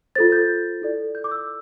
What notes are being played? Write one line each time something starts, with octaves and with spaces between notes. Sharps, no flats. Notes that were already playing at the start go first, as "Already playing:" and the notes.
F4 A4 C5 A6
G6
E4 A4 D5
G6
D6
E6